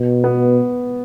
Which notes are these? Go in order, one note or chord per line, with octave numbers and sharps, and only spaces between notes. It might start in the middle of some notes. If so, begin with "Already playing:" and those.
Already playing: B2
B3